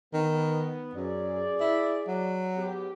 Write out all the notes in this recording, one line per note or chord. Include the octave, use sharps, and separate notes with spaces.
D#3 B3
F#2 G#4 D5
E4
F#3
G#2 B3 G4